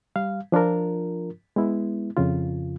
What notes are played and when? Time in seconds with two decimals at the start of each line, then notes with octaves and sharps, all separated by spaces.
0.16 G3 F5
0.52 F3 D4 F4 A#4
1.56 G#3 B3 E4
2.16 F2 C#3 F4